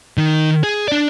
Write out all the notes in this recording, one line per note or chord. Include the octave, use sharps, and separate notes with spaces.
D#3
G#4
D4 D5